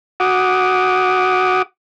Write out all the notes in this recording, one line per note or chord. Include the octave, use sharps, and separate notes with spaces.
F#4 F#5 D6 D#6